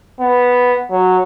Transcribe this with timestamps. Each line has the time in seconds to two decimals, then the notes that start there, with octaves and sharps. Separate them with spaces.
0.20 B3
0.92 F#3